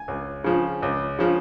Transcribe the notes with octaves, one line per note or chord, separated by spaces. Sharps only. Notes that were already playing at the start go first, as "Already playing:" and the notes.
Already playing: G#5
C#2
C#3 F3
C#2
C#3 F3